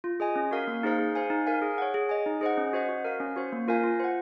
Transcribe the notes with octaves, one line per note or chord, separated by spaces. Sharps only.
F4
G#4 D#5 G#5
C#4
F#4 A#4 F5
A#3
D#4 G#4 C5 F5
G#4
C5 F5 G#5
D#4
A#4 F5 G#5
G#4
C#5 F#5
G#4
D#5 G#5
D#4
G#4 C5 D#5 F#5
C#4
F#4 C5 D#5 F#5
F#4
A#4 F5
C#4
F#4 C5
A#3
F4 A#4 F5 G#5
F4
C5 F#5